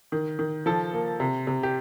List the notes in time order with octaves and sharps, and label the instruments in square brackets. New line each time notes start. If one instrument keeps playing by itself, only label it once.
[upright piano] D#3
D#3
F3 A4
A#3
C3
C3
G4